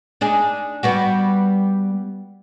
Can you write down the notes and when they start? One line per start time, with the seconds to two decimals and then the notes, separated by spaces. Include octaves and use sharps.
0.21 D4 D#4 G#4
0.83 G3 B3 F#4